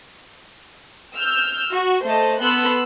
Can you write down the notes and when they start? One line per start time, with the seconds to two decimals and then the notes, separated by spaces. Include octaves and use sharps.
1.16 E6 F6 G6
1.73 F#4
2.03 A3 C5 D#5 A5
2.39 B3 A4 C6 E6 F#6